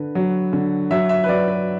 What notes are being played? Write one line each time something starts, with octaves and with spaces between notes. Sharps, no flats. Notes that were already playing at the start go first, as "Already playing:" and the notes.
Already playing: D3 B4
F#3
D3
F#3 E5
E5
B4
F#3 D5
B4